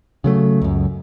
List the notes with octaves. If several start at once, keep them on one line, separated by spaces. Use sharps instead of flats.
C#3 F#3 A3
C#2 F#2